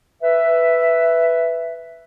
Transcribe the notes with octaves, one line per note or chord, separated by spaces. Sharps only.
B4 E5